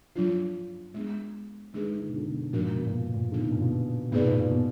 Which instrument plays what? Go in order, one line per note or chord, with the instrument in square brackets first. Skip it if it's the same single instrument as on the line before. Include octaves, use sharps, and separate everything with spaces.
[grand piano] F3 [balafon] F#3 D4 F4
[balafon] G#3 B3 D4 G#4
[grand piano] D#3 [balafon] G#3 D4 G#4 B4
[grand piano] D3
B2
D3
B2
[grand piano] A#2 [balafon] F3 G#3 D4 F#4 A#4
[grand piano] B2
A#2
B2
A#2
[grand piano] D3 [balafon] D#3 F#3 B3 D#4
[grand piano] B2
A#2
B2
[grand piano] A#2 [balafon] B3 D#4 G#4 B4 D5
[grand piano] B2
A#2
B2